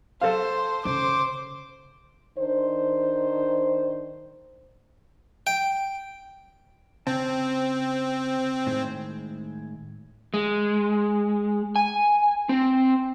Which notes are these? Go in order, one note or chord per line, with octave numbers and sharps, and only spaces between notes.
A4 C5 F5
C#3 C5 D6
D#3 D4 C5
G5
C#3 C4 A5
A2 D#3 G#3
G#3
G#5
C4